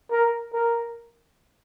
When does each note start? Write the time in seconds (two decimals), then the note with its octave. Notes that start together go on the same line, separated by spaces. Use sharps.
0.11 A#4
0.53 A#4